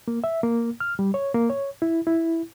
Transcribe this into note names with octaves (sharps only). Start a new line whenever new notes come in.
A#3
E5
A#3
F6
G3
C#5
A#3
C#5
E4
E4